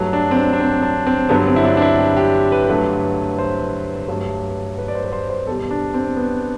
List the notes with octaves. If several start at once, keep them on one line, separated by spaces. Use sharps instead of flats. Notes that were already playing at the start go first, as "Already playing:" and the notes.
Already playing: G2 F#3 A3
D4
C4
D4
D4
C4
D4
C4
G2 D3 F#3 B3
C4
E4
D4
D4
E4
G4
G4
B4
G2 D3 F#3 A3
C5
G2 F#3 A3
B4
D5
C5
B4
C5
C5
E2 B2 G3 A4
D4
C4
B3